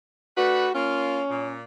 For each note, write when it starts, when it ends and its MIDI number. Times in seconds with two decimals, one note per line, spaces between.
0.37 0.68 57
0.37 0.68 62
0.37 0.74 66
0.37 0.68 71
0.75 1.21 58
0.75 1.58 61
0.75 1.21 65
1.30 1.63 46